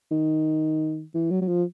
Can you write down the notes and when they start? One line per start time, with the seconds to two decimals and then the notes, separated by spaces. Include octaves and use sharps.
0.11 D#3
1.14 E3
1.31 F#3
1.42 F#3
1.48 F3